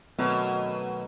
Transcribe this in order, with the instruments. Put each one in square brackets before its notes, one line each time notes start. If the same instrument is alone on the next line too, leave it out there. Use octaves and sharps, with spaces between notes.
[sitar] B2 [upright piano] D#3 F#3 A3